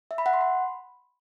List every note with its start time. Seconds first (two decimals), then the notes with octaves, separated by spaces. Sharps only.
0.11 E5
0.18 B5
0.26 F#5
0.33 C6
0.41 B5